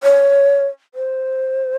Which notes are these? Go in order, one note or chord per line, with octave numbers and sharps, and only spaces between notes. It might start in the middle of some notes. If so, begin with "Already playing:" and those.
C#5
C5